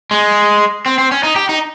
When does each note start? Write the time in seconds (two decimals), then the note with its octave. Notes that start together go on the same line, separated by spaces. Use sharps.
0.11 G#3
0.86 C4
0.98 C4
1.12 C#4
1.23 D#4
1.36 G4
1.49 D#4